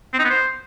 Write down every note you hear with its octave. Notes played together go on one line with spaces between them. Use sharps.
C4
D#4
B3
C5